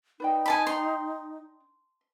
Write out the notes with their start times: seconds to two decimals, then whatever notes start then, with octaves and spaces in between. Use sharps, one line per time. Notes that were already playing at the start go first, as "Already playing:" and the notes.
0.20 D#4 B4 D5 G5
0.46 G#5 A5 B5
0.67 D4 G5 A#5 C6